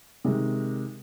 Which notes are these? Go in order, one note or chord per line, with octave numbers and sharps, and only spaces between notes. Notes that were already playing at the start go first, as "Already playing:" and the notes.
C3 D#3 G#3